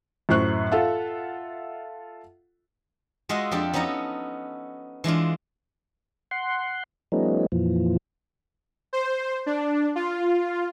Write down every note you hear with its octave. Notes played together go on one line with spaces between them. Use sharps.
F#2 A2 C5 C#6 F#6
F4 A4 E5 F#5
G#3 F4 F#4 D#5 E5 F#5
F2 D4 G4 A4 G5
B3 C#4 D#4 F#4 A4 A#5
E3 G#3 D4 F4
F#5 C6
F3 G3 A3 B3 C#4 D#4
F2 A#2 E3 F3
C5
D4
F4